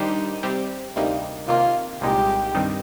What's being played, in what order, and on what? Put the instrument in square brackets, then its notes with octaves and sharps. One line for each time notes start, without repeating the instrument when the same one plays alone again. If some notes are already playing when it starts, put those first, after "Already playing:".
Already playing: [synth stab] D#3 G3 D4 G4 C5 [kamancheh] D#4
[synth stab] C3 G3 C4 G4
D2 C3 G3 A#3 D#4
[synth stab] C3 D#3 A#3 [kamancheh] F4
[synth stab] C2 A#2 G#3 D#4 [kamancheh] G4
[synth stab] G2 D#3 G3 C4 D#4